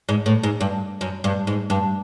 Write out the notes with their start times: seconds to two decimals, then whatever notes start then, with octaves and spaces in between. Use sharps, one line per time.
0.09 G#2
0.26 A2
0.43 G#2
0.61 G2
1.01 F#2
1.24 G2
1.47 G#2
1.70 G2